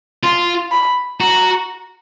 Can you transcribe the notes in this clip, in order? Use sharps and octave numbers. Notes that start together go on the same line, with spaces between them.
F4 C6
B5
F#4 A#5